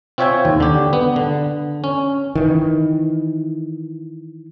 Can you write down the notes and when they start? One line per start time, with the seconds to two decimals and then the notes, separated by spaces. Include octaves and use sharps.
0.18 C4 F4 C#5 E5 G5 G#5
0.45 D#2
0.60 D3 G4
0.93 B3
1.16 D3
1.84 C#4
2.35 D#3 E3